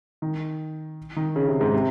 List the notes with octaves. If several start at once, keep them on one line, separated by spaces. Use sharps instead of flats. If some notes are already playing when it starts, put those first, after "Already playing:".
D#3
D#3
C#3
C3
G#2
C3